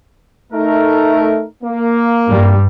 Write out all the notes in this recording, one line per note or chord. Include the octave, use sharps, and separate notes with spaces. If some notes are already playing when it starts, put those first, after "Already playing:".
A3 D#4 A#4
A#3
G2 G3